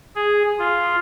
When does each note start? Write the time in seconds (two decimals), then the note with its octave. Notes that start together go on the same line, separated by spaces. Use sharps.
0.15 G#4
0.59 F4